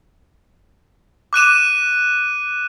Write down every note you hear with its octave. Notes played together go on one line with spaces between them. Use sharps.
D6 F#6 D#7 E7